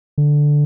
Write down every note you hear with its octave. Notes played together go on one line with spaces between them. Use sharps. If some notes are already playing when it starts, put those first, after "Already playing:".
D3